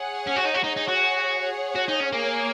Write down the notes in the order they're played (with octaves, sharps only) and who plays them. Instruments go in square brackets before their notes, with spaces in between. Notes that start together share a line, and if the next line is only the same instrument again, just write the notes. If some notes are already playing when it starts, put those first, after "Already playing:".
Already playing: [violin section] G#4 C#5 F#5
[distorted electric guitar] C#4
F#4
D#4
F#4
[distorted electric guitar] D#4 [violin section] G#4 C#5 F#5
[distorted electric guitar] D#4
F#4
[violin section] G#4 C#5 F#5
[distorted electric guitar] F#4
D#4
C#4
[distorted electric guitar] A#3 [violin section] G#4 C#5 G#5